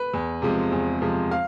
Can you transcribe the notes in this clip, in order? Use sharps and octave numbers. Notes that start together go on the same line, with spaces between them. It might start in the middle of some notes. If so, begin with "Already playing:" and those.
Already playing: B4
E2
C3 F3 G#3
E2
C3 F3 G#3
F5